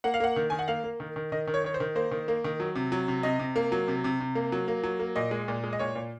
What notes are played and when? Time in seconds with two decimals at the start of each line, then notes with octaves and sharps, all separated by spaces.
0.04 A#3 F#5
0.14 F5
0.20 A#3 F#5
0.36 D#3
0.50 D#3 G#5
0.59 F#5
0.68 A#3 F5
0.84 A#3
1.00 D#3
1.16 D#3
1.32 D#3 D#5
1.48 D#3
1.54 C#5
1.64 D#3 C#5
1.74 C5
1.80 D#3
1.95 A#3 C5
2.12 D#3
2.28 A#3
2.44 D#3
2.60 F#3
2.75 C3
2.92 F#3
3.08 C3
3.23 C3 D#5
3.39 C3
3.56 A#3
3.72 F#3
3.88 C3
4.04 C3
4.20 C3
4.35 A#3
4.52 F#3
4.68 A#3
4.83 F#3
4.99 A#3
5.16 A#2 D#5
5.31 G#3
5.48 A#2
5.64 G#3
5.73 D#5
5.79 A#2 C#5
5.95 A#2